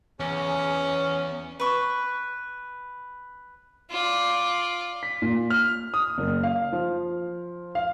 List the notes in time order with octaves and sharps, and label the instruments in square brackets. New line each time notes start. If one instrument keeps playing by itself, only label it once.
[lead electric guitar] E2 [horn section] C#3 C#4
[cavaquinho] B4 C#6
[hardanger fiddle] F4 D5
[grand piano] B6
A#2
F6
D#6
F#1
F5
F3
F5